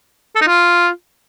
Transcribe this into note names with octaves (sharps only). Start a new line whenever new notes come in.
A4
D#4
F4